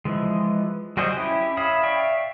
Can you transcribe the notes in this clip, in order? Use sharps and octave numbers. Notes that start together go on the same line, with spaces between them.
E3 F3 G#3
G3 F#4 G#4 C5 D#5
C#4 E4 G4
C#5 E5 F5 B5 D#6
D5 E5 F5 G5 C#6